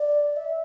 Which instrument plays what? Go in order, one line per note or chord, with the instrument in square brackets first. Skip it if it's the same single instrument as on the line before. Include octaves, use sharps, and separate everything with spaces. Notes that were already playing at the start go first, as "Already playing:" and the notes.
Already playing: [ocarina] D5
E5